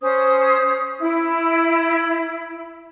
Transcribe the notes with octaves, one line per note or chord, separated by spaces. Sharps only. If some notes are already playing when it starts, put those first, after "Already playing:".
C#4 C5 D#6
E4